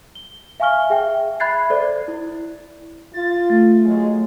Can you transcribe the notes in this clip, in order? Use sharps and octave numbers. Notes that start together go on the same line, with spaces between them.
G7
E5 F5 G#5 C#6 F6 G7
G#4 E5 G5
E5 B5 F#6 G#6 A6 C7
A4 C5 D5
E4
F4 A6
A3
F#3 G#3